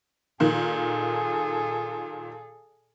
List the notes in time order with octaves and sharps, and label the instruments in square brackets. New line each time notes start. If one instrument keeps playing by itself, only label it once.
[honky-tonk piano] A#2 D#3 [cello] G#4 A4